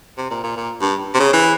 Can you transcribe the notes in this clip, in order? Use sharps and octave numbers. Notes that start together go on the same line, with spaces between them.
C3
A#2
A#2
A#2
G2
C3
C#3
E3